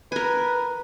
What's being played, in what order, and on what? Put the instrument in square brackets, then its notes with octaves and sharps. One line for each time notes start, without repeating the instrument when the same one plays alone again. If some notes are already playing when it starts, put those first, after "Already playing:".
[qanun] A#4 G#5 [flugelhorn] B4